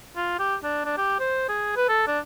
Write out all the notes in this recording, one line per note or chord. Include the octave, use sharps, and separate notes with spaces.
F4
G4
D4
D4
G4
C5
G#4
B4
A4
D4